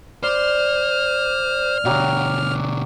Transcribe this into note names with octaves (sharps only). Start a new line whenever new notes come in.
C5 D5 F6
B2 D3 F#3 G4 F5